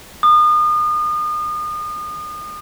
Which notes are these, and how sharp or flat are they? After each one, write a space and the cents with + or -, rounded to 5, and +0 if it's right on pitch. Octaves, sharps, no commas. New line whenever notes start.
D#6 -35